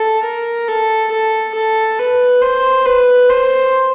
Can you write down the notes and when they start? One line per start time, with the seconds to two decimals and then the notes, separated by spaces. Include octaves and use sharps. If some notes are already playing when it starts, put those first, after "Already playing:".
Already playing: A4
0.24 A#4
0.68 A4
1.12 A4
1.55 A4
1.99 B4
2.42 C5
2.86 B4
3.30 C5